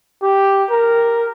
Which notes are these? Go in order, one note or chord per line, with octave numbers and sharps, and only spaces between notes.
G4
A#4